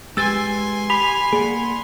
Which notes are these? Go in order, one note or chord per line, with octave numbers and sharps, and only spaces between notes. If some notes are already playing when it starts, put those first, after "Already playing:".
G#3 G4 B4 G#5 C6 E6 A6
G4 B5 B6 F7
A#3 G#4 D5 F#5